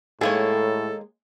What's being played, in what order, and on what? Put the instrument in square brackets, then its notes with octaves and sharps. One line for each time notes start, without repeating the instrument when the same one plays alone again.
[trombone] A2 [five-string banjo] D#3 A#3 C#5 [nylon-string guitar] G#3 G#4 [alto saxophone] A4